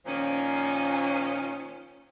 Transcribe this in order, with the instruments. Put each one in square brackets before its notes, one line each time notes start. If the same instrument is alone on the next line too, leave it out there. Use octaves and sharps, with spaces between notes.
[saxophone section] A#2 D#3 F3 C#4